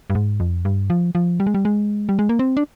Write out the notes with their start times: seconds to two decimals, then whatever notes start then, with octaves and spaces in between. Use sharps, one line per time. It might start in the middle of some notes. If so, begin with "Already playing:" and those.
0.10 G2
0.15 G#2
0.40 F2
0.65 G2
0.90 F3
1.15 F3
1.40 G3
1.47 G#3
1.54 G3
1.65 G#3
2.09 G3
2.19 G#3
2.29 A#3
2.39 C4
2.57 D4